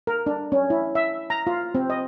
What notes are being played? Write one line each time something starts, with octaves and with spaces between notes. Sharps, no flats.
A#4
D4
C#4
E4
E5
A#5
F4
C4
D#5